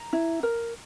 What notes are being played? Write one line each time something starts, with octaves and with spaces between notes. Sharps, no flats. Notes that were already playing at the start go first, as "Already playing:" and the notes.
Already playing: A#5
E4
A#4